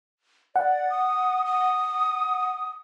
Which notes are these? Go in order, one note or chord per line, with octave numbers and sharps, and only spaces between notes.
D5 F#5
D#6
D#6